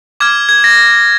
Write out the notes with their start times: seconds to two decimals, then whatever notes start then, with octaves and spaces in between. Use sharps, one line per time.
0.20 D6 F6 G#6
0.49 G#6
0.64 A#6